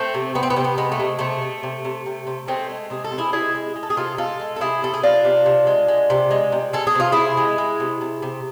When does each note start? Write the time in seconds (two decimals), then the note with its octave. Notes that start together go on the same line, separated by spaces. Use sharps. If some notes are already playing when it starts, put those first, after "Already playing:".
Already playing: A3 C4
0.14 C3
0.35 C3 B3
0.43 C4
0.50 B3
0.56 C3 C4
0.64 B3
0.78 G#3 B3
0.92 A3
1.00 C3
1.19 C3 A3
1.42 C3
1.63 C3
1.85 C3
2.06 C3
2.27 C3
2.47 G#3 A3 C4
2.70 G#3
2.90 C3 G#4
3.04 A4
3.12 C3
3.18 E4 G#4
3.33 G#3 E4 G#4
3.55 G#3
3.76 G#3
3.83 A4
3.90 G#4
3.97 C3 F4 A4
4.18 G#3 F4 A4
4.40 G#3
4.56 A4
4.60 C3 E4 G#4
4.82 C3 A4
4.94 G#4
5.03 C3 D4 F4
5.25 C3
5.46 C3
5.67 G#3
5.88 G#3
6.10 C3
6.31 G#3
6.52 C3
6.73 G#3 A4
6.87 G#4
6.95 C3 F4
7.12 C3 E4 G#4
7.37 G#3
7.58 G#3
7.80 C3
8.01 C3
8.22 C3